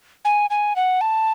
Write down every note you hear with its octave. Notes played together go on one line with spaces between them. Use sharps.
G#5
G#5
F#5
A5